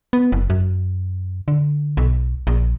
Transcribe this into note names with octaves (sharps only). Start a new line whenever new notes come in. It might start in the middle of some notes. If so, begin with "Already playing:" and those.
B3
F#1
F#2
D3
B1
A#1